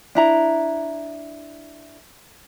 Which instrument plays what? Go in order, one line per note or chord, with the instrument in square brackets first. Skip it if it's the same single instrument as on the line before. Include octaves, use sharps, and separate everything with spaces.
[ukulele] D4 E4 A#5